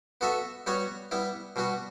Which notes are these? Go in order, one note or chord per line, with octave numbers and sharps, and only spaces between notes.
B3 F#4 A4 E5
G3 B3 F#4 C#5
G3 B3 E4
B2 G3 B3 F#4